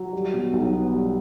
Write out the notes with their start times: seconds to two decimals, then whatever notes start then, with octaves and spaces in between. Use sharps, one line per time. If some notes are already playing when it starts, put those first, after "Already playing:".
Already playing: F#3
0.13 G3
0.34 B2
0.53 B1
0.73 B3
0.94 G3